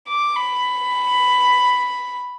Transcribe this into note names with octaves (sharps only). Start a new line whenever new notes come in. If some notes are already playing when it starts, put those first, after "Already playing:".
D6
B5